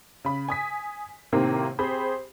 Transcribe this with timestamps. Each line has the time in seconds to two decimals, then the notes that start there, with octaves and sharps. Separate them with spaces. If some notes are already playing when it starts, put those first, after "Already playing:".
0.24 C#3 B5
0.48 G#5 D#6 B6
1.32 A2 C3 D#3 A#3 C4
1.79 C4 G4 G#4 C5 B5